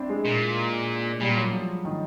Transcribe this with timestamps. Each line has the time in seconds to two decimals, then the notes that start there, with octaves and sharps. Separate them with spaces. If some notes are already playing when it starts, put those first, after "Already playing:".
Already playing: C4 D4 E4
0.10 G#3
0.25 A#2
1.21 A#2 G3
1.37 F#3
1.52 F3
1.85 D#3